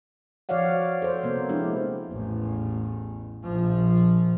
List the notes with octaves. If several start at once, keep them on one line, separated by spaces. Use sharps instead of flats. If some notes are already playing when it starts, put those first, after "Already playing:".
F3 F#4 C#5 D5 F5 F#5
A4 C5
C3 A#3 B3
F3 G#3 D4 E4 G4
A1 E2
A#1 F3